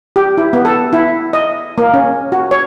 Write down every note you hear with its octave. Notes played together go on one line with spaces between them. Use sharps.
G4
E4
B3
A4
E4
D#5
A#3
C#4
F#4
C#5